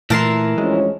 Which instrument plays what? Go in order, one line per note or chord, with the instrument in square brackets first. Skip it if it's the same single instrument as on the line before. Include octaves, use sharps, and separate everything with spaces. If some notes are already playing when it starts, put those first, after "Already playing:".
[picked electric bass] A#2 A3 [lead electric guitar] E3 E4 [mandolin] A#4 A5 C6
[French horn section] D2 F3 C#4 [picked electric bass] G#3